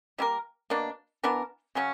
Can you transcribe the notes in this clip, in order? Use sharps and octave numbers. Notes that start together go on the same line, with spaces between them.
G3 A#3 E4 A#4
B2 A#3 D4
E3 B3 D4 A#4
C#3 F#3 C#4